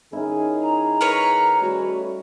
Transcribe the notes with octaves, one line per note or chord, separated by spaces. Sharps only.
D#3 C#4 D#4 E4 G#4
A#5
A#4 B4 C#5
G3 A3 C#4 F#4